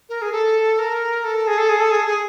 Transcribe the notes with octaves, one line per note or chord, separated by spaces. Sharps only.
A#4
G#4
A4
A#4
A4
G#4
A4
G#4
A4
G#4
G#4